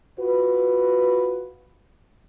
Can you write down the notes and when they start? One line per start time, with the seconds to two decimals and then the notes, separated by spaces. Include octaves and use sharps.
0.19 F4 F#4 B4